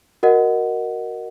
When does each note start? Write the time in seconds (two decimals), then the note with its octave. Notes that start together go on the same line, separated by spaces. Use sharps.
0.23 F#4 A#4 D#5 F#5